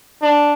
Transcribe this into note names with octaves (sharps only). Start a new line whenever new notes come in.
D4